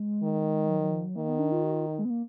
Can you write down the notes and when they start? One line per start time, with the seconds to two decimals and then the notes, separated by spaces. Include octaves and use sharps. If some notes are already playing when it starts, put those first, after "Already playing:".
Already playing: G#3
0.23 D#3
0.69 F#3
0.82 F#3
0.92 F3
1.04 F#3
1.16 D#3 A#3
1.29 B3
1.39 D4
1.52 F4
1.63 F#4
1.74 F4
1.87 D#4
1.99 G#3
2.05 B3
2.10 A#3